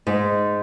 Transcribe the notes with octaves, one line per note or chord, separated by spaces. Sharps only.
G#2